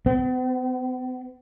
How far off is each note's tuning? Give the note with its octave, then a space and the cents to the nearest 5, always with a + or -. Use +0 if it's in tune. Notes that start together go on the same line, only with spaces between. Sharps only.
B3 +45